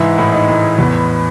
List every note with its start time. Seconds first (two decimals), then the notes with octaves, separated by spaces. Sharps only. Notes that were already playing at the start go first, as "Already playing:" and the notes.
Already playing: G#2 E3 E4
0.18 A2
0.32 D#4
0.48 A2
0.78 E2 B3